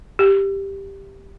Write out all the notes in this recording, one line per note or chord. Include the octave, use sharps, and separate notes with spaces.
G4